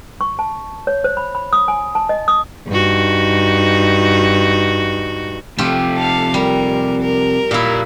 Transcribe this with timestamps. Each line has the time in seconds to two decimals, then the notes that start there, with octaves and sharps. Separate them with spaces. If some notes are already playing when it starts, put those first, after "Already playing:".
0.21 C#6
0.39 A5
0.87 C#5
1.04 C5
1.17 B5
1.35 B5
1.53 D#6
1.68 G#5
1.95 A5
2.09 D#5
2.28 D#6
2.68 G2 D#4 F#4
5.58 C3 F3 A3 F4 G4
5.96 A4 F5
6.34 G3 A#4
7.01 A#4
7.51 A#2 E4 G4 F5